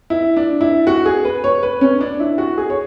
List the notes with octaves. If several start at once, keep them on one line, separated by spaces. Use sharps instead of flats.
E4
D4
E4
F#4
G#4
B4
C#5
B4
C#4
D4
E4
F#4
G#4
C#5